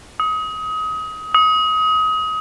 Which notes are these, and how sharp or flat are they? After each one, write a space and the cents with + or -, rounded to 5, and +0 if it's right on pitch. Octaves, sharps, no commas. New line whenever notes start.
D#6 +25
D#6 +25